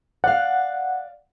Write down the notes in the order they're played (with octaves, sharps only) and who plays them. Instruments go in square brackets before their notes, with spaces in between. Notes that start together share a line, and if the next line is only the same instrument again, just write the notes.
[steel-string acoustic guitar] D5 F5 [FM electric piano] F#5